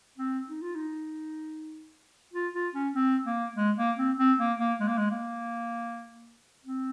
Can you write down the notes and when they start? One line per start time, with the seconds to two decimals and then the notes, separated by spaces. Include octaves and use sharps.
0.18 C4
0.49 D#4
0.62 F4
0.76 D#4
2.34 F4
2.54 F4
2.75 C#4
2.95 C4
3.26 A#3
3.56 G#3
3.77 A#3
3.97 C4
4.19 C4
4.39 A#3
4.59 A#3
4.80 G#3
4.88 A#3
4.98 G#3
5.11 A#3
6.65 C4